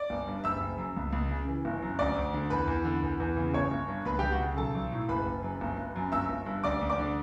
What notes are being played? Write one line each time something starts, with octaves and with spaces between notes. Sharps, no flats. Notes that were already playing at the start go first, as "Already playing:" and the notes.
Already playing: D5 D6
G1
G2
F#1 E5 E6
F#1
F#2
C#2
C#2
C#3
E3
G1
F#2
D2 D5 D6
D2
D3
E2 B4 B5
E2
D3
E2
E2
C#3
G1 C#5 C#6
G1
G2
C#2 B4 B5
C#2 G4 G5
F#4 F#5
C#3
B1 A4 A5
B1
A2
F#1 B4 B5
F#1
F#2
G1
G1
F#2
G1 E5 E6
G1
G2
D2 D5 D6
D2
D5 D6
D3